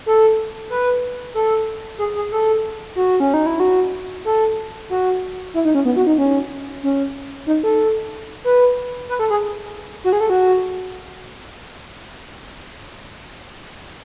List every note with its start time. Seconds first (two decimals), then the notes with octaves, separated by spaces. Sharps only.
0.06 A4
0.70 B4
1.34 A4
1.98 G#4
2.16 G#4
2.32 A4
2.96 F#4
3.20 C#4
3.34 D#4
3.46 E4
3.60 F#4
4.25 A4
4.90 F#4
5.54 E4
5.65 D#4
5.75 C#4
5.85 B3
5.96 F#4
6.07 D#4
6.18 C#4
6.83 C#4
7.47 D#4
7.63 A4
8.44 B4
9.09 B4
9.19 A4
9.30 G#4
10.04 F#4
10.13 G#4
10.20 A4
10.30 F#4